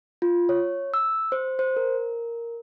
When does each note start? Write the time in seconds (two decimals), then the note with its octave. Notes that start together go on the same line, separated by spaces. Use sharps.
0.22 F4
0.49 C#5
0.94 E6
1.32 C5
1.59 C5
1.77 A#4